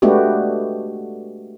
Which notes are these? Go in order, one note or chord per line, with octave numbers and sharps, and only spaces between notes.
G#3 A3 B3 D4 F#4 G4